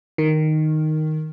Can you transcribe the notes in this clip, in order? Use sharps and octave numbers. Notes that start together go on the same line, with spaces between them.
D#3